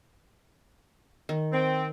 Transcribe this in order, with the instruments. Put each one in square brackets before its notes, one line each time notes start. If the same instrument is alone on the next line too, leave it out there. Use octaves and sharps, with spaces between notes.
[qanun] D#3
[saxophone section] C4